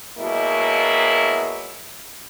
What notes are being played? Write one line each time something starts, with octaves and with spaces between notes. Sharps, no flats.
B2 F#3 G#3 A#3 E4